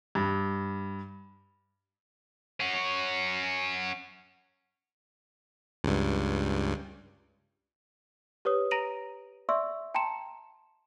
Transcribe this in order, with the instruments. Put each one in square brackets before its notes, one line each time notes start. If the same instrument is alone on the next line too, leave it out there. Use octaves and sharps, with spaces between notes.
[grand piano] G2
[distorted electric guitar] C#4 F#4
[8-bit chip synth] C#2 G2
[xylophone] G4 B4 C#5 D#6
A#5 A#6 D7 D#7 F7 F#7
D5 E5 C6 C#6 E6
G5 A5 A#5 C6 C#7 E7